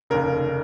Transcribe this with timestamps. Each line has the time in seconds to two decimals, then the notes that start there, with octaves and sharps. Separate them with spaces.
0.10 F1 D#2 C#3 A#4